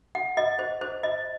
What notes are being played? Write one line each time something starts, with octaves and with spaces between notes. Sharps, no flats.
F#5
D#5
C5
C5
D#5